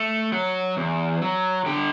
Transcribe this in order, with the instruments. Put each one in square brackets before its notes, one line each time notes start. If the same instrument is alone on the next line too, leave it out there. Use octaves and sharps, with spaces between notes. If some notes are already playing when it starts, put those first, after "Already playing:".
Already playing: [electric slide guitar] A3
F#3
E2
F#3
D3 G4